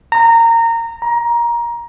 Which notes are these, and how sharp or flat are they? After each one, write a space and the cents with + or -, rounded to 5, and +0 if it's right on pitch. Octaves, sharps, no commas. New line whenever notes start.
A#5 -20
A#5 +20